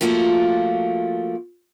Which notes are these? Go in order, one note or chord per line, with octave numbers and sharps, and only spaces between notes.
F3 A3 A#3 F4 F#4